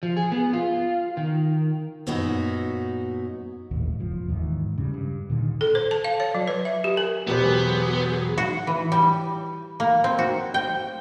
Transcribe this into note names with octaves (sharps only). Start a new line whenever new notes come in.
F3
G#4
B3
F4
D#3
F#2 A#2 F#3 B3 D#4 F#4
D#1 G#1 D#2 A2
F1 F3
D#2 G#2 D#3 E3
C#3 G3
G2
A#2 D3 D#3
A4
C5
A5
F5
C#5
F#3
B4
E5
G4
A#4
E1 F#3 B3 G4 G#4 C5
F#4
E3
G3
A#3
C4
F#4
G5